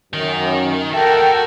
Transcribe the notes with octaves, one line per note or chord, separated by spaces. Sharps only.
F#2 D#3
F#4 A4 A#4 E5 G5